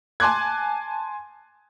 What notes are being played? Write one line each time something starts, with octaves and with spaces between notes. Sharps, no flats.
G#5 A5 C6 D6 F#6 G#6